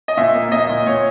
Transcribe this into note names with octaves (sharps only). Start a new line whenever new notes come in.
D#5
A#2 E5
A#3
A#3 D#5
A#2
A#2 C#5